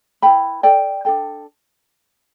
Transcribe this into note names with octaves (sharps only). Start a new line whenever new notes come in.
E4 B4 G5 B5
A4 D5 G5
D4 A4 G5